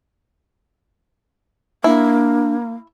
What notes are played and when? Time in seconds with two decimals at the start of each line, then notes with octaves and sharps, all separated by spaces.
1.84 A#3 D4 E4